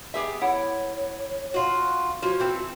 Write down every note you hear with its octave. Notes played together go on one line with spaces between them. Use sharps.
B3 G4 G#4 E5
E4 C#5 F#5
F4 F#4
F3 F4 F#4 C#5
E3 C4 A4